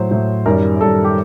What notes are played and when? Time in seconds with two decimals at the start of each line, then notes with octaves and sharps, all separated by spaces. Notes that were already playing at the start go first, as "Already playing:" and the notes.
Already playing: A2 F#3 C5
0.11 A2 F#3
0.46 F#2 D#3 G3 A#4
0.81 F#2 D#3 G3 A4
1.04 G4